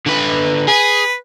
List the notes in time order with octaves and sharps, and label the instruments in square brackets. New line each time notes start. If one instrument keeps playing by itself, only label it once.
[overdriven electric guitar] D3 B4
[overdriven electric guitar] G#4 [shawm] B4